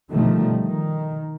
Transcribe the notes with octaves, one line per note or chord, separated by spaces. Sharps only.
B2 D3 D#3 F3 G3 A3
D#3